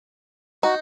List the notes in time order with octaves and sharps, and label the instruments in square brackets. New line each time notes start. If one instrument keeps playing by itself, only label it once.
[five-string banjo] D#4 [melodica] F#4